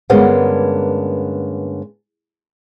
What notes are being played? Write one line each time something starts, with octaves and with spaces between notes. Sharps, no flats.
G2 D3 G#3 A#3 B3 C#4